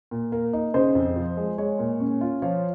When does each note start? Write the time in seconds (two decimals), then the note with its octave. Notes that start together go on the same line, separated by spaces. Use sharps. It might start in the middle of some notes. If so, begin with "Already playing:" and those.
0.11 A#2
0.32 A#3
0.53 D#4
0.74 C#3 C5 D#5
0.95 F2
1.16 F3
1.37 G#3
1.58 G#3 C#5
1.79 A#2
2.00 C#4
2.21 F4
2.42 F3 C#5 F5